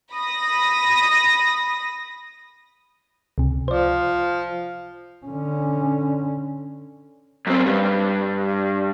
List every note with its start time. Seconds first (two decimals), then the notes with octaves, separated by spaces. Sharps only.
0.14 B5 D#6 A#6
3.38 C#2 C3
3.68 F3 C5 D5
5.26 D3 C#4
7.47 F#2 C4
7.66 G2